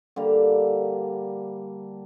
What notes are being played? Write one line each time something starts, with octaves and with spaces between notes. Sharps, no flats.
D3 G3 A#3